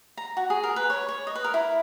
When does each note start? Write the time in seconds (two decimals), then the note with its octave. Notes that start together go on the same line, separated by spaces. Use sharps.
0.17 A#5
0.37 F#4
0.50 G#4
0.64 A#4
0.76 B4
0.90 C#5
1.09 C#5
1.27 D#5
1.35 B4
1.44 A#4
1.54 E4